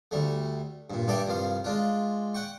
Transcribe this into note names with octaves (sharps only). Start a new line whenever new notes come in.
D2 G3 A3
G2 A#2
G2 G4 A4 D5 E5 G5
C2 G2 F3 F5
G#3 D4 F4
F#5 G5 C#6